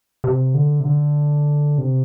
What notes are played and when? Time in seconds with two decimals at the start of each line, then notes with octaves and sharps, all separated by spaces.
0.24 C3
0.54 D3
0.80 C3
0.85 D3
1.78 C3